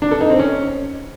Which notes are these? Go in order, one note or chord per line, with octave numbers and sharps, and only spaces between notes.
D4
A4
D#4
C4
C#4